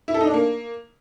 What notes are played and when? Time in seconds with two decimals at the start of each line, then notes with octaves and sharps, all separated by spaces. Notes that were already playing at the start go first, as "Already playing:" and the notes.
0.08 E4
0.14 A4
0.21 D#4
0.27 D4
0.34 A#3